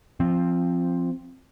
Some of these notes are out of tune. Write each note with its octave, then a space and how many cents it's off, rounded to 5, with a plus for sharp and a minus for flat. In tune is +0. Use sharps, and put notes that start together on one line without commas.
F3 -10 C4 +5